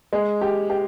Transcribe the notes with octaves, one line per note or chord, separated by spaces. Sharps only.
G#3
G4
G4